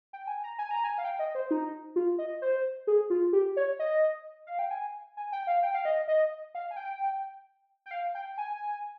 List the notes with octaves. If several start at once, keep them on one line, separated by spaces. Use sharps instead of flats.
G5
G#5
A#5
G#5
A#5
G#5
F5
G5
D#5
C5
D#4
F4
D#5
C5
G#4
F4
G4
C#5
D#5
F5
G5
G#5
G#5
G5
F5
G5
F5
D#5
D#5
F5
G#5
G5
G5
F5
G5
G#5